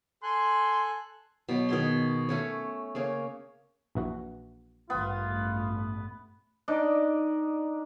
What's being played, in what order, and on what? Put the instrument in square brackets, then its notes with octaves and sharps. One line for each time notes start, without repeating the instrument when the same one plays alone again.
[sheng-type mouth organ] A4 G#5 F#6 [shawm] C6
[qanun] B2 F#3 B3
B2 D#3 G#4 C6
A3 C#4 C#5
C#3 A#3 C#4
[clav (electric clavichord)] A#1 E3 F#4
[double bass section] A1 G2 A3 [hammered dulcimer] B3 [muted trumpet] F4
[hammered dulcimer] D4 D#4 D5 D#5